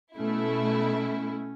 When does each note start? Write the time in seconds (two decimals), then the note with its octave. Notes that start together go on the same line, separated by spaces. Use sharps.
0.16 B2 A3 C#4 E4